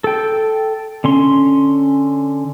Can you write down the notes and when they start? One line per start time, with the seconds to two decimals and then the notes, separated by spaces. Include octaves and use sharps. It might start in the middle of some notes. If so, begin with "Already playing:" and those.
0.04 A4 G5
1.04 D3 C#4 C6